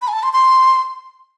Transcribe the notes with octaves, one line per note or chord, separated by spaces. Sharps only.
B5
G#5
A5
C6
C6